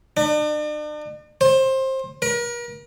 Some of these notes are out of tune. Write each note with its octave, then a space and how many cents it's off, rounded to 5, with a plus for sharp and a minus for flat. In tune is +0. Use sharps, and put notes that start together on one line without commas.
D4 +45
C5 +20
A#4 +40